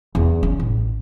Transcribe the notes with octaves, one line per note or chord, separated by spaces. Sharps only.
E2
C#4
A1